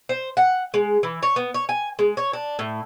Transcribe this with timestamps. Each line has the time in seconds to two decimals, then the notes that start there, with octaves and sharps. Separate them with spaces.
0.09 C5
0.37 F#5
0.74 G#3
1.03 E3
1.23 C#5
1.36 B3
1.54 C#5
1.69 G#5
1.99 G#3
2.17 C#5
2.33 D4
2.59 A2